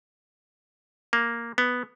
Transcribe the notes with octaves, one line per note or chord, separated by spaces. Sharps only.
A#3
B3